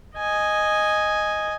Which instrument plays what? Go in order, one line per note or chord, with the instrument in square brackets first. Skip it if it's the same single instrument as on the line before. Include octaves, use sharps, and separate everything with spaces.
[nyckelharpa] D#5 G#5